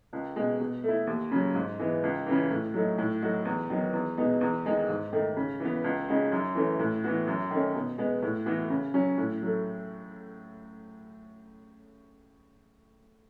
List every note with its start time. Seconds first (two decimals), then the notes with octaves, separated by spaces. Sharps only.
0.13 C#2
0.36 B2 G#3
0.60 B2
0.84 A3 E4
1.07 D#2
1.31 C#3 F#3
1.55 G#2
1.79 E3 G#3 B3
2.03 C#2
2.26 C#3 E3
2.50 A2
2.74 F#3 A3 D#4
2.98 A2
3.22 F#3 A3 D#4 F#4
3.45 E2
3.70 D#3 F#3 B3
3.93 E2
4.17 B2 G#3 B3 D#4
4.41 E2
4.65 D#3 G#3 D#4
4.88 G#2
5.13 D#3 A3
5.36 C#3
5.60 E3 B3
5.84 C#2
6.08 C#3 G#3 D#4 F#4
6.32 F#2
6.55 E3 A3 C#4
6.79 A2
7.04 E3 B3 F#4
7.27 F#2
7.51 D#3 A3 C#4
7.75 B2
7.98 G#3 B3
8.22 A2
8.46 E3 B3 F#4
8.70 C#3
8.94 F#3 C#4
9.18 A2
9.42 F#3 A3